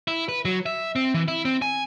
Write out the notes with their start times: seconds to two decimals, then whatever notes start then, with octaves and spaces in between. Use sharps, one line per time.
0.08 E4
0.29 B4
0.45 F#3
0.66 E5
0.96 C4
1.14 E3
1.28 E4
1.45 C4
1.62 G#5